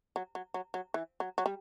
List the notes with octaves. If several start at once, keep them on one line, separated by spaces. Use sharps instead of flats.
F#3
F#3
F#3
F#3
E3
F#3
F#3
G3